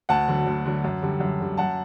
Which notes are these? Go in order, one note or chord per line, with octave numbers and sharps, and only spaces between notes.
D2 F#5 A5
D3 F#3
D2
D3 F#3
F#2
D3 G3
F#2
D3 G3
F#2 F#5 A5